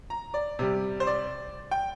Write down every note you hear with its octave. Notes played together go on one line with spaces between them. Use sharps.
A#5
D5
C3 G3
C5
D5
G5